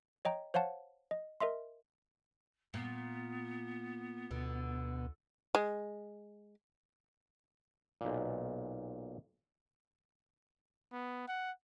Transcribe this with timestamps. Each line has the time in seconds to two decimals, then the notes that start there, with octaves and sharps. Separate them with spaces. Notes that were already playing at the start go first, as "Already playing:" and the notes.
0.25 C#5 D#5 G5 A#5
0.54 C5 C#5 F5 F#5 A5
1.11 D#5
1.40 A#4 D#5 E5 C6
2.74 A#2 B3
4.31 D2 B2 D3
5.55 G#3
8.01 B1 A#2
10.93 B3
11.28 F#5